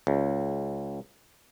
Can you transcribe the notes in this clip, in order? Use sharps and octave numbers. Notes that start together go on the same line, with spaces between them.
C#2